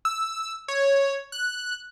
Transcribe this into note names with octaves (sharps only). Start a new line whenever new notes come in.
E6
C#5
F#6